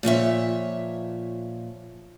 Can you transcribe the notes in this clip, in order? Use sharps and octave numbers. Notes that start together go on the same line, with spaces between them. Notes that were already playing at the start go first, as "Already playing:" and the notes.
A#2 F3 C#5 E5